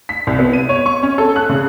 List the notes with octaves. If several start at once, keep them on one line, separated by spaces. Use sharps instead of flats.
B6
C2
B3
D#7
C#5
C#6
C#4
A4
F#6
C#3